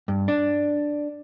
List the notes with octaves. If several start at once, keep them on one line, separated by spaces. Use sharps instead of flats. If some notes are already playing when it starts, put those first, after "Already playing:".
G2
D4